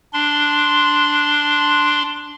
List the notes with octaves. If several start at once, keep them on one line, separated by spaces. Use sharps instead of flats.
D4 C6